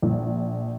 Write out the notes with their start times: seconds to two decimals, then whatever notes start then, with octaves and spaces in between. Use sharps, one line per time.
0.02 A#1